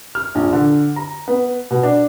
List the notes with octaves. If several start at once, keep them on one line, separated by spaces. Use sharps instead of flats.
F6
A#1
D3
A#5
B3
B2
D4